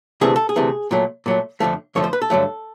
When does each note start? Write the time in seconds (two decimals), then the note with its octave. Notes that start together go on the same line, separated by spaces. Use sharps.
0.21 D2 C3 E3 A3 G#4
0.36 A4
0.49 G#4
0.56 D2 C3 E3 A3
0.91 A#2 F#3 A3
1.26 A#2 F#3 A3
1.60 F2 D3 F3 A3
1.95 F2 D3 F3 A3 C#5
2.04 C5
2.13 B4
2.22 A4
2.30 G2 D3 F#3 A3